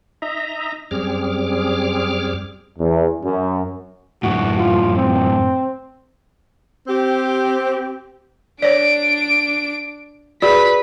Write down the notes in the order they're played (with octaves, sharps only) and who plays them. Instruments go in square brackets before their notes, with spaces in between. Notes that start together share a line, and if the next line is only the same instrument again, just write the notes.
[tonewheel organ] D#4 D#5 E5 A#5
F#2 G3 C4 G#4 D6 F6
[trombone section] E2
F#2
[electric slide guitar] F#2 A2 [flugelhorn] F#4
[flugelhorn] F4
C4
[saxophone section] C4 G4
[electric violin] D4 D7 [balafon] C#5 D5
[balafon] F#4 G#4 D5 [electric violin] B4 B5